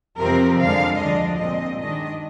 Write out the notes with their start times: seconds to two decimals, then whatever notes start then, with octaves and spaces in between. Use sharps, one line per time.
0.19 F2 C3 F3 C4 A#4
0.59 F2 D3 G#3 F5
0.99 D2 D3 F3 G#3 D4 D#5
1.39 A#2 G#3 C4 D#5
1.79 G2 D#3 G#3 D4 D#5